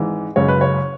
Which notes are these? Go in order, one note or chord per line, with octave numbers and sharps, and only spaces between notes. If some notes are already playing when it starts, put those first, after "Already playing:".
Already playing: G#1 G#2 E3
F#1 F#2 C#3 G#3 C#5
B4
C#5